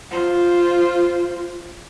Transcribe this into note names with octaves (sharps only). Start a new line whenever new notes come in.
F4 C5